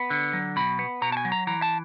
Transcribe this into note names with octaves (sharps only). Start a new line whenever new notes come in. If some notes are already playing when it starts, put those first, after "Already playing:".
Already playing: B3 B5
D3
F#3
B2 B5
B3
B2 A#5
A5
G#5
F#3
A#5
E3 A#5
A5